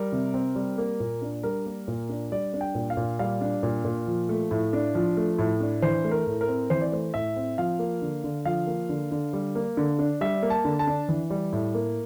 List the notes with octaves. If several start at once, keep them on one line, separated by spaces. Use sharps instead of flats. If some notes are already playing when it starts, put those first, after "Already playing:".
Already playing: G3 A#4
C3
C4
G3
A#3
A#2
D4
G3 A#4
A#3
A#2
D4
G3 D5
D4
G5
A#2
F5
A#2
G3 F5
D4
A#2
A#2
F3
A3
A2
D4
F3
A3
A2
D4
E3 C5
A3
A#4
A2
A#4
C4
E3 C5
D5
A3 C5
A2 E5
C4
F3 F5
A#3
D3
D3
F3 F5
A#3
D3
D3
G3
A#3
D3
D4
G3 E5
A#3
A5
D3
A5
D4
E3
G3
A2
A#3